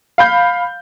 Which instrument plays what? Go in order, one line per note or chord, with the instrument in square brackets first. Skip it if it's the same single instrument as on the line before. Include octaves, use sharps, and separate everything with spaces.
[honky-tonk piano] F5 B5 G6